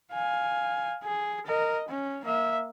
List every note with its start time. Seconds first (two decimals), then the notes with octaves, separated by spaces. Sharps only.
0.13 F5 G#5
1.04 G#4
1.46 A#4 D#5
1.88 C#4
2.24 A#3 E5